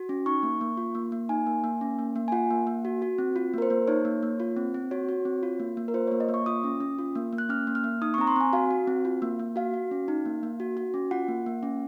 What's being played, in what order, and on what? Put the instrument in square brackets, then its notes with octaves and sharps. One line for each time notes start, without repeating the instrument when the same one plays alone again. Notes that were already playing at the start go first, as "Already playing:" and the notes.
Already playing: [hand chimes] F#4
C#4
D#4 C#6
A#3
A#3
F4
A#3
A#3
D#4 G#5
A#3
A#3
C#4
A#3
A#3
G#5
F4 F#5
A#3
A#3
F#4
F#4
C4
F4
A#3 A#4
C5
A#3
D#4 C#5
A#3
A#3
F4
C4
C4
F#4 C#5
F#4
C4
F4
A#3
A#3
A#4
F4 C5
C#5
A#3
D#5
A#3
C#6
F4 D#6
C#4
C#4
F4
A#3
A#3
F#6
C#4 F6
A#3
F6
A#3
D#4 D#6
C#6
C4 A#5
C6
C4 G#5
F#4 F5
F#4
C4
F4
A#3
A#3
F#4 F5
F#4
C#4
D#4
A#3
A#3
F#4
F#4
C#4
F4 F#5
A#3
A#3
C#4